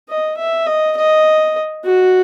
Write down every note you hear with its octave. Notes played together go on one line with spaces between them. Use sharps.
D#5
E5
D#5
D#5
F#4